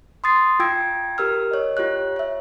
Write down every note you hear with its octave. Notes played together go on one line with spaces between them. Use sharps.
C6 D#6 A6 C7
F4 G5 E6 G#6 D7
G4 A#4 E6 F6
C#5 D#5
F4 G4 C#5 F#6
C#5 E5